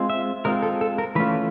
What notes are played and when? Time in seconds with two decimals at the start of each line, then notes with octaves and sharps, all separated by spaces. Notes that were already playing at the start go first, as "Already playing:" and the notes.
Already playing: G#3 C4 F4
0.10 E5
0.45 G#3 C4 F4 A#4
0.63 A4
0.81 A4
0.98 A#4
1.15 E3 A3 C#4 F4 B4